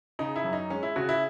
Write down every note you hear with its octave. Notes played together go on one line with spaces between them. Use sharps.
C#3 D#4
E4
F#2
D#4
G#3 C#4
E4
C#3 F#4
E4